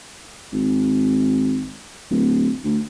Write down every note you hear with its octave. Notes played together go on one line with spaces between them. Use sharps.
G#1
D1
D2